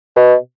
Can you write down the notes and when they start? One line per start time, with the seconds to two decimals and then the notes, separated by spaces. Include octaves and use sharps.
0.16 B2